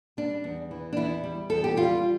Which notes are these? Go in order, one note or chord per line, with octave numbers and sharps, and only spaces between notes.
G3 D4
E2
E3
D4
E2 E4
G3
E2 A4
G4
G3 F4